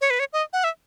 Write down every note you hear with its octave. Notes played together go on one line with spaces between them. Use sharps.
C#5
B4
C#5
D#5
F#5
E5